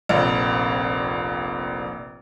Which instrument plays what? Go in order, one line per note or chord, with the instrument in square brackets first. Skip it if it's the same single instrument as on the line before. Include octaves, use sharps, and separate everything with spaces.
[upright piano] F1 A#1